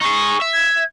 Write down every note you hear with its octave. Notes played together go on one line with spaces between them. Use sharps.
D#4 G#4 C#6
E5
G#6